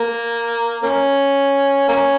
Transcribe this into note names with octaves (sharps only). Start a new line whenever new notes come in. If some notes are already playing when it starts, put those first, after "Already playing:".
Already playing: A#3
A#3 C#4
A#3 C#4